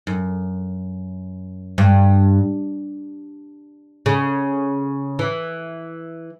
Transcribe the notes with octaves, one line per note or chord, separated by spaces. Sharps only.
F#2
G2
C#3
E3